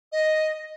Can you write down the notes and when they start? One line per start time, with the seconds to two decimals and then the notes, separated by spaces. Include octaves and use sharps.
0.12 D#5